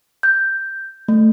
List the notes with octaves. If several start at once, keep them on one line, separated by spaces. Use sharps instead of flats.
G6
A3